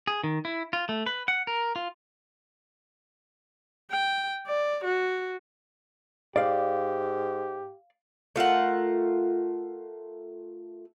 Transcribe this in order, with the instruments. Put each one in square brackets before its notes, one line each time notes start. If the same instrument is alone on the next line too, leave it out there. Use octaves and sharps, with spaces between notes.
[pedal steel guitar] G#4
D#3
E4
F4
A3
B4
F#5
A#4
F4
[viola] G5
D5
F#4
[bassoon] G#2 [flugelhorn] G4 [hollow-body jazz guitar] D5 F5
[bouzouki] A3 F4 A#4 F#5